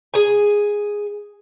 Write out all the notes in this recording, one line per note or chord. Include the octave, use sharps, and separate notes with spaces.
G#4 G#5